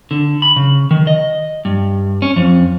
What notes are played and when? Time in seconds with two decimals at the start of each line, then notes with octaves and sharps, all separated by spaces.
0.11 D3
0.42 B5
0.56 C#3
0.91 D#3
1.07 D#5
1.65 G2
2.22 C#4
2.36 F2